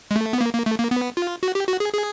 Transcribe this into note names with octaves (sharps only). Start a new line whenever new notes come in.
G#3
A3
B3
A#3
A#3
A3
A#3
B3
F4
F#4
G4
F#4
G#4
G#4